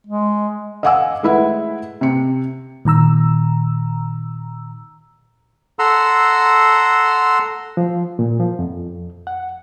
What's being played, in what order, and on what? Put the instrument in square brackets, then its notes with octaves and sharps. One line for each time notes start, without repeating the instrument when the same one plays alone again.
[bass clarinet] G#3
[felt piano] D#5 F5 F#5 G#5 D6 E6
G#3 A3 E4 B4 E5 F#5
C3 C#7
[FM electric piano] A#2 D#3 A#5 E6
[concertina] A4 F#5 A#5 C6 E6
[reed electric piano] F3
A#2
F3
F2
F#5